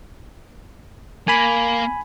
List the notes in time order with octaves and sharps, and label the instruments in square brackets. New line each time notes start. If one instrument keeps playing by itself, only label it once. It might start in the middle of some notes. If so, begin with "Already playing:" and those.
[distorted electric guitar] A#3 [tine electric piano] G#5 B5